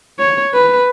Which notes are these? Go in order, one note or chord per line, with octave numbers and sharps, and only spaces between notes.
C#5
B4